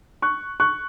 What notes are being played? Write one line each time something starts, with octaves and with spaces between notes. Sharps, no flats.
C#6 F#6
C#6 F#6